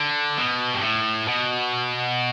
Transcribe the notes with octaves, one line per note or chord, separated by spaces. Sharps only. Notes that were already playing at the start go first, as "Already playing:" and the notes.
Already playing: D3
B2
G2
A2
B2